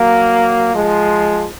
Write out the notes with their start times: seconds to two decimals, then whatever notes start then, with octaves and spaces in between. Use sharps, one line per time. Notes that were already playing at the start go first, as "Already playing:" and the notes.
Already playing: F#3 A#3
0.74 F3 G#3